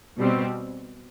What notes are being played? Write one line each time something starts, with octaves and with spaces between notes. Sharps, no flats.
B2 G3 C4